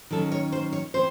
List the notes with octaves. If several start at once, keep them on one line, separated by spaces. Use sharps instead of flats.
D#3 F#3 C#4 A4
C#5
C5
C#5
E3 C4 C5